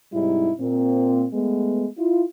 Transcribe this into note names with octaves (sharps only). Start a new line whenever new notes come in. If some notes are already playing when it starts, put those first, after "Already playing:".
G#2 C3 G3 D#4 E4
A#2 A#3 C4
G#3 A3 B3
E4 F4